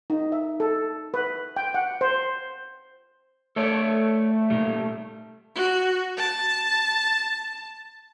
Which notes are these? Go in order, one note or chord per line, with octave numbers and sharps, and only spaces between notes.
D#4
E5
A4
B4
G5
F#5
C5
A3 A4 C#5 D5
A#2 G3
F#4
A5